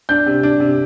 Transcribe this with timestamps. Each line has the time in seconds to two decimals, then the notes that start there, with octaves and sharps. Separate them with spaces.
0.09 D4 G6
0.26 C3
0.43 D4
0.60 C3